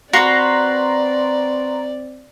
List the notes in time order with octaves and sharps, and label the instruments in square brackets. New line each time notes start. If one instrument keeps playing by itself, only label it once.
[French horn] C4 [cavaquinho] F#4 B4 [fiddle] D5 [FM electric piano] A#5 C6